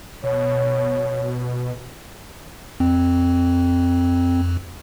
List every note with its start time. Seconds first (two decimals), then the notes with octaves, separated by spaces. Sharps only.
0.24 B2 C#5
2.80 F2 C4